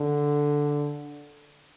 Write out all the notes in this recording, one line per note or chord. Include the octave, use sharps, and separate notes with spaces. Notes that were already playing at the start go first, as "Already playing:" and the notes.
Already playing: D3